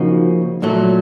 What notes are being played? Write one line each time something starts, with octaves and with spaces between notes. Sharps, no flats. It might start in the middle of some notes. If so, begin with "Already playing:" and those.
Already playing: C#3 F3 A#3 D#4 F#4
A#2 F#3 A3